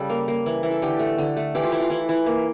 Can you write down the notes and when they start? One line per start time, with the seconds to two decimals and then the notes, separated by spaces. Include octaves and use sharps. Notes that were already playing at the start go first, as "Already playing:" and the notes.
Already playing: C#3 G3 A4
0.10 A#3
0.28 A#3
0.46 E3
0.63 E3
0.71 A4
0.82 D3 G4
0.99 A3
1.18 D3
1.36 A3
1.55 E3 G4
1.63 F4
1.72 E3 E4
1.80 F4
1.90 E3 E4
2.09 E3
2.26 A#3